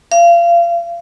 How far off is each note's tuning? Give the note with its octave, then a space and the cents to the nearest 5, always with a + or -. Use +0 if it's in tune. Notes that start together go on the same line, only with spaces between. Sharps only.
F5 -30